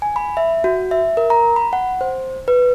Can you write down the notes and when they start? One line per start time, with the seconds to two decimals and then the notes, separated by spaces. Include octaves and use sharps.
0.02 G#5
0.16 B5
0.37 E5
0.64 F#4
0.91 E5
1.17 A#4
1.30 A#5
1.56 B5
1.73 F#5
2.01 C5
2.48 B4